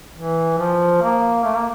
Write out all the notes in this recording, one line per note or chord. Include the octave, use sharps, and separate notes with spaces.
E3
F3
A#3
A3
A#3